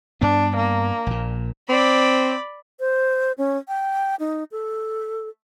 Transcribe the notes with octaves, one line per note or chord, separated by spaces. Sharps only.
G2 B3 D4
A#3
A#1 A#2
C4 D5 B5
C5
C#4
G5
D#4
A4